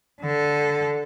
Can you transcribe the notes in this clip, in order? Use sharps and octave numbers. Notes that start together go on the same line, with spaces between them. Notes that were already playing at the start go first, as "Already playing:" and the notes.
D3 A4